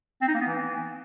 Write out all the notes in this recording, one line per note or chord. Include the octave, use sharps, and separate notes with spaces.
C4
D#4
A#3
B3
E3